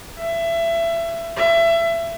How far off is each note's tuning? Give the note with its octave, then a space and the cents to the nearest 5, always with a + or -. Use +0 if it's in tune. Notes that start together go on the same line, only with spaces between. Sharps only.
E5 +25
E5 +25